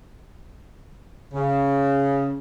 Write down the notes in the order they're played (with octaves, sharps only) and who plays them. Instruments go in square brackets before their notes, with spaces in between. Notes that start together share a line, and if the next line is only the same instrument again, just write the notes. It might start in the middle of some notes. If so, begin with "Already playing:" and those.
[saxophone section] C#3